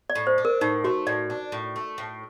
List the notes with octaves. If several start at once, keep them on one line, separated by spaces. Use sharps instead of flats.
D5
A2
C5
D4
A#4
A2 D#4
A3 F#4
A2 D5
D4
A2
A3
A2